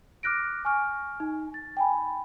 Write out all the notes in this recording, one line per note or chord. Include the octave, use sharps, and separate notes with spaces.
D6 F6 F#6 A#6 D7
G#5 C#6 F6
D#4
A6
G5 G#5 B5